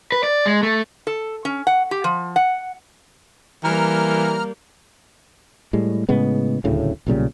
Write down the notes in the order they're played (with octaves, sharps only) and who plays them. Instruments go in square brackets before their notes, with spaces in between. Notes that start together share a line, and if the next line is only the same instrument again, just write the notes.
[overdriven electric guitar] B4
D5
G#3
A3
[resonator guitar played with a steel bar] A4
C#4
F#5
G4
F3
F#5
[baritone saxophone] E3 [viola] G3 A#3 [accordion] A#5 F6
[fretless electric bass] A2 G3 G#3
A2 C#3 G#3 B3
D#1 D2 A2 C#3
B1 A#2 C#3 G3